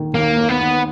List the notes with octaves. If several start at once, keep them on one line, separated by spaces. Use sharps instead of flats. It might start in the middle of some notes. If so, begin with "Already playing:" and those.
Already playing: D#2 D#3
D#2 A#3
D#2
B3
D#2